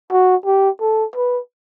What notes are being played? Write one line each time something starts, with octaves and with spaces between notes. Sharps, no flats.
F#4
G4
A4
B4